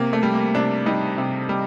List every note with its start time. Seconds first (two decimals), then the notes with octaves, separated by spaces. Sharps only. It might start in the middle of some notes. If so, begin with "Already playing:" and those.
Already playing: C3 A#3
0.13 A3
0.23 G3
0.34 A#3
0.55 C3 D4
0.86 G3 D#4
1.18 C3
1.49 G3